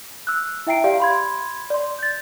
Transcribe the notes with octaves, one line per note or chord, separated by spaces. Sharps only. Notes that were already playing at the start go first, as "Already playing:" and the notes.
E6 F#6
E4 E5 G5 A#5 C7 D7
G4 D5 F5
B5 C6 G#6
D5 C6
G6 A6